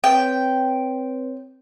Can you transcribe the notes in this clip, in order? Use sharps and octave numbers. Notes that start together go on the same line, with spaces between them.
C4 B4 C#5 G5